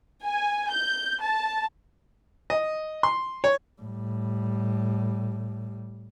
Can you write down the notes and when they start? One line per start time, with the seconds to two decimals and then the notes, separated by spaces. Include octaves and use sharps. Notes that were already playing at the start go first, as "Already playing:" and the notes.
0.24 G#5
0.71 G6
1.21 A5
2.50 D#5
3.03 C6
3.44 C#5
3.82 A2 G3